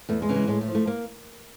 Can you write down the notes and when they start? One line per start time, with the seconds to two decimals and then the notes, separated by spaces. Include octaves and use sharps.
0.09 E2 A3
0.22 G#3
0.29 C#3 E3
0.35 G#3
0.48 A2 G#3
0.61 A3
0.67 F3
0.75 A3
0.87 A#3